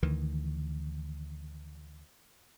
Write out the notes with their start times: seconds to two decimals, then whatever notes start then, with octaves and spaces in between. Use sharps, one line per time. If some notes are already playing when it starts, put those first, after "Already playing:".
0.03 D2 D#3 E3